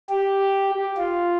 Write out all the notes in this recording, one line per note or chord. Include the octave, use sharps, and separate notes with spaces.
G4
F4